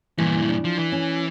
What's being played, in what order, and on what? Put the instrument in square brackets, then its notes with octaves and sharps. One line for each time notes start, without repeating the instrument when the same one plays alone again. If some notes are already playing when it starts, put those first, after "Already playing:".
[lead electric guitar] G2 A#2 [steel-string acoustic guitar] E3
[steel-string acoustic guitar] D4
[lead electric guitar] F3
E3
[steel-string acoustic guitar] C#4